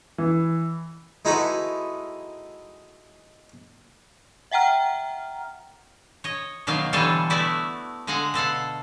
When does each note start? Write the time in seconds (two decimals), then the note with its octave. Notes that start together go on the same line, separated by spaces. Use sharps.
0.18 E3
1.25 G#3 D#4 E4 F#4 A4 B4
4.51 E5 F#5 G5 A#5 F6
6.24 C#5 D#5
6.67 B2 D#3 F#3 A#3 F5
6.93 D3 E3 G3 A4 C#5 F5
7.30 A3 B3 E4 F#4 D5
8.07 D3 G#3 F5 F#5 A#5
8.34 B2 A4 F5 F#5